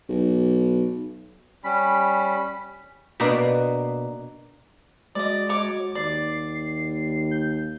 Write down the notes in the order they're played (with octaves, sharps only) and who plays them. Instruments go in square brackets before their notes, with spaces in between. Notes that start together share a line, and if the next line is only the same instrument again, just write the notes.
[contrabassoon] B1
[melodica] G3 C#4 B5
[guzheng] B2 A#3 D4 B4 A#5
[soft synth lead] G#3 [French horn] F#4 [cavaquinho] D5 D#5
[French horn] F#4 [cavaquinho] C#5 D6
[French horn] D#2 [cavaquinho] D5 [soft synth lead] C7
[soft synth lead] G6